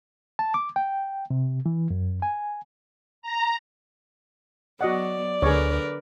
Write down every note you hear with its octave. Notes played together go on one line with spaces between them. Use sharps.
A5
D6
G5
C3
E3
F#2
G#5
A#5
F#3 B3 F#4 D5 D#5 F#5
D2 D3 G#4 A#4 B4 C#5